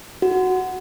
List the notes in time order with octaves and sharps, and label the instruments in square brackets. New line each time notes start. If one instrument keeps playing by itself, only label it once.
[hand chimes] F#4